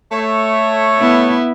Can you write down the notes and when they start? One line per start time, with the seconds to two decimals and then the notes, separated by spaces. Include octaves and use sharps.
0.12 A3 C#5
0.99 B3 E4